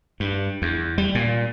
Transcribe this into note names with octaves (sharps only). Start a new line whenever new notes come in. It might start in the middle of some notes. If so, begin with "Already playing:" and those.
G2
E2
G3
A#2